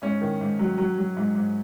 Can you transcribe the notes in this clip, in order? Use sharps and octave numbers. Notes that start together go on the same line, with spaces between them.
G#2 C#4
D#3
G#2
F#3
F#3
F#3
G#2
G#2